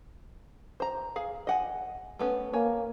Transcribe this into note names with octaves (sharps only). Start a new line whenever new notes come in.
C5 A#5
G#4 F5
D#5 F#5 G#5
A3 B3 C#4
A#3 C#5 G#5